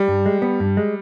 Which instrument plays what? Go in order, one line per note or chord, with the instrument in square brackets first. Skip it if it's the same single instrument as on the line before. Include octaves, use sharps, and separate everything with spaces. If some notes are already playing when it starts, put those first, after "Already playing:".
Already playing: [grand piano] G3
[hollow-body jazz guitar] G2
G#3
B3
G2
G#3